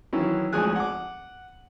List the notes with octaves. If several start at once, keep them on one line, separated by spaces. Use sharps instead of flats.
D#3 E3 F#3 C#4 E4
G#1 D2 F3 G#4 G#5 F#6
F#5 D6